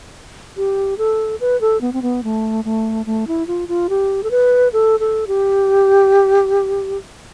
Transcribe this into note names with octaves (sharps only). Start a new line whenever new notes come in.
G4
A4
B4
A4
B3
C4
B3
A3
A3
A3
E4
F4
F4
G4
A4
B4
A4
A4
G4